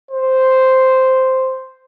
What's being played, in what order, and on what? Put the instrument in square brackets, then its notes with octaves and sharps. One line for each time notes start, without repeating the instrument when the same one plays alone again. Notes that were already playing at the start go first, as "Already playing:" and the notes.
[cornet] C5